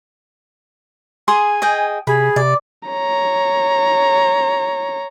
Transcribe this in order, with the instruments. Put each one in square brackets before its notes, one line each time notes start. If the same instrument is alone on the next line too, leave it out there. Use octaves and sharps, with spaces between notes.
[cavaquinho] G#4 C6 D#6 [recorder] G#5
[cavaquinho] G#4 D#5 G5
[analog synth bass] C3 [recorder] G#4 [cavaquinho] B5
[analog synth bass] C3 [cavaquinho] D5
[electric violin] C#5 A#5